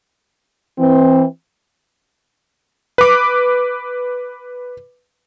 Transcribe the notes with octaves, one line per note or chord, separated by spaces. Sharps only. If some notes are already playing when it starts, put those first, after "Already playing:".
E3 C4
B4 D6